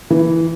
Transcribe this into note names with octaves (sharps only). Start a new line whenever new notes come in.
E3